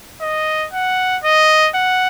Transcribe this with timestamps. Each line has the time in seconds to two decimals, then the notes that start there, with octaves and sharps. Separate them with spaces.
0.22 D#5
0.73 F#5
1.24 D#5
1.75 F#5